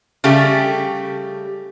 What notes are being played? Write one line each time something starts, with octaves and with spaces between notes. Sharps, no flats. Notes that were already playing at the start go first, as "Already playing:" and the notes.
C#3 G3 A3 G4